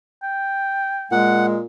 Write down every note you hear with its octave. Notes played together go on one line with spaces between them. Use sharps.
G5
A#2 G#3 F#5